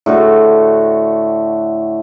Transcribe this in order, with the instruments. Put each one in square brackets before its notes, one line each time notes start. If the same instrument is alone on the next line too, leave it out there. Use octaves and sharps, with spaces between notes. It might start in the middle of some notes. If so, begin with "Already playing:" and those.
[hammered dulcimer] A2 D3 F#4